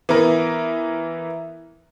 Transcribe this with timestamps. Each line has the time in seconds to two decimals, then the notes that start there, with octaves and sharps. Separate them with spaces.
0.09 E3 B3 A#4